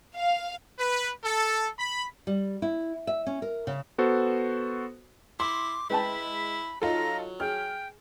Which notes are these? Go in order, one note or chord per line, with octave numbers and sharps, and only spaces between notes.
F5
B4
A4
B5
G3
E4
E5
C#4
A#4
C#3
B3 F#4 A4 C5
E4 C6 D6
G#3 E4 B4 G5 A5 B5
F#3 D#4 F4 A4 A#5
G#4 G5 F6